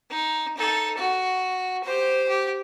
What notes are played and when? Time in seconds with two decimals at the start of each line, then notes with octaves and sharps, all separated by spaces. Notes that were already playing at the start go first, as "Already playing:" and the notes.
0.11 D#4
0.58 D#4 A4
0.97 F#4
1.84 G4 C5
2.29 G4